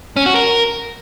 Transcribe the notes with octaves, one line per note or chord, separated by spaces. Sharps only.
C#4
F#4
A#4